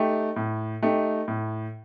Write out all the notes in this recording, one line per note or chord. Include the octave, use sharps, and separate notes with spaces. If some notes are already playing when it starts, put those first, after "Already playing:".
Already playing: A3 D#4 G4
A2
A3 D#4 G4
A2